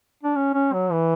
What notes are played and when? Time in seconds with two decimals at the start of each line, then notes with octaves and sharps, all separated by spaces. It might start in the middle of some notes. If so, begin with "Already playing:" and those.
0.23 D4
0.36 C#4
0.54 C#4
0.73 F#3
0.91 E3